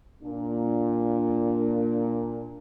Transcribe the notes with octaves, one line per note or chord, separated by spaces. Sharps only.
A#2 D4